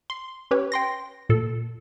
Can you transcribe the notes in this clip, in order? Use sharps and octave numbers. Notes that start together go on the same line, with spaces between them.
C6
C#4 G4 B4 C#5
G5 C6 A#6
A#2 A4